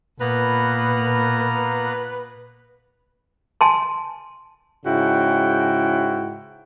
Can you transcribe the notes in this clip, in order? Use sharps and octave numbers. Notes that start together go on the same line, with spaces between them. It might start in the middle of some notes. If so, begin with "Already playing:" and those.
A#2 A#3 B3 B4 A#5
G#5 A5 C6
G#2 C#3 E4 F#4 G5